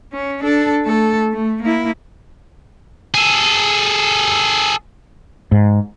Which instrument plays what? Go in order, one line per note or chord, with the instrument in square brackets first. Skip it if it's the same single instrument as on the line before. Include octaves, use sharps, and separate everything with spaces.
[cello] C#4
D4 A4
A3 A4
A3
A#3 E4
[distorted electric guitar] G#4 A4
[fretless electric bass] G#2